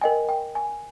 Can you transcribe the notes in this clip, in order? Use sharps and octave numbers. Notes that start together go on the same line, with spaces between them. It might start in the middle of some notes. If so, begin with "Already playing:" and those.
A#4 D#5 G5 G#5
G5
G#5